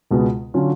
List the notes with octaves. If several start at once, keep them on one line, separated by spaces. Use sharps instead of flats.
C#2 B2 G#3 B3
D3 F#3 C#4 F4